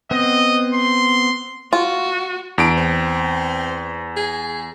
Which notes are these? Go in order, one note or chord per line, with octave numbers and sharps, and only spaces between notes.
B3 C4 D#5
C6
F4 F#4
E2 D4 D7
C4
G#4